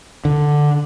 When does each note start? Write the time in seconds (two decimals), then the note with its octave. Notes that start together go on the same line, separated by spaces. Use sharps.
0.25 D3